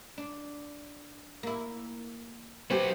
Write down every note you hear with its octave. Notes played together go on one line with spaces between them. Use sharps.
D4
A#3 E4
F#3 G4 A4 B4 C5